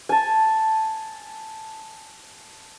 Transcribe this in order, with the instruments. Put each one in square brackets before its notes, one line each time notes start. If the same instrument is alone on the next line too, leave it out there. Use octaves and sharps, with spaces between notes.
[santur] G#5 A5